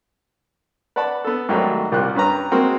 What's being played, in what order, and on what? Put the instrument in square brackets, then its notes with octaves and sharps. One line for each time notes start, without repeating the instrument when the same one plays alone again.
[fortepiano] B4 D5 F#5 A5 B5
B3 A4
G#2 D#3 F#3 G3 A3
C2 G3 F4 G4 A#4 F#6
G2 C#4 B4 A#5
G#3 A#3 C4 F#4